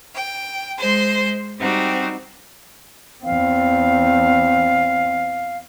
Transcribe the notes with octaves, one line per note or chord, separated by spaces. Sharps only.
G5
G#3 C5 C6
G3 C4 D#4 F#4 G4
E2 C4 F5